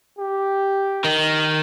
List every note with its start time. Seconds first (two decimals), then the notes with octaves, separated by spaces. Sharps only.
0.19 G4
1.04 D#3